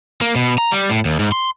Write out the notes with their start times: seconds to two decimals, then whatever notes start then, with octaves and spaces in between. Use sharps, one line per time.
0.21 A#3
0.36 B2
0.58 A#5
0.72 G3
0.90 A2
1.05 D#2
1.19 G#2
1.32 C6